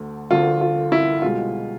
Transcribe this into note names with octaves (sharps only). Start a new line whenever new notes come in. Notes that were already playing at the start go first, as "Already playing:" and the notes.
Already playing: D2 D3 A3
D2 D3 A3 F4
F4
E4
C2 B2 G#3 F4